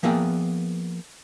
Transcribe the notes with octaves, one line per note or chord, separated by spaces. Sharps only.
F3 A#3 B3 G#4 E5 G5